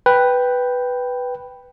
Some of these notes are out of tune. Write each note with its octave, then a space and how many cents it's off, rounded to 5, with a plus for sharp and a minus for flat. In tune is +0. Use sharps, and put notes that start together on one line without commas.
B4 +0 G5 +0